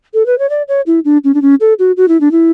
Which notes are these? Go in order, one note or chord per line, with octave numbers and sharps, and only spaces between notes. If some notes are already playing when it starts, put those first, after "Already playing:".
A4
B4
C#5
D5
C#5
E4
D4
C#4
D4
C#4
A4
F#4
F#4
E4
D4
E4